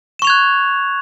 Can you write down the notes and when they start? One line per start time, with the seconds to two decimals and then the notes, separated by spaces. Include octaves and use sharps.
0.19 E7
0.22 C#6
0.25 F7
0.27 G#6
0.30 F#6